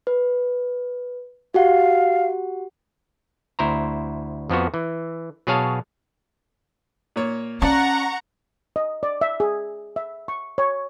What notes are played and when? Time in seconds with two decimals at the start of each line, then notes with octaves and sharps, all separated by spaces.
0.07 B4
1.54 F#4 G4 F5 F#5
3.59 D2 E4 C5 A#5
4.50 F2 F3 B3 F#4
4.74 E3
5.47 B2 F#3 G#4 C#5 F5 A5
7.16 A#2 A#3 C#5
7.62 C#4 D5 F5 F#5 A5 A#5 C#6
8.76 D#5
9.03 D5
9.21 E5
9.40 G#4
9.96 E5
10.28 C#6
10.58 C#5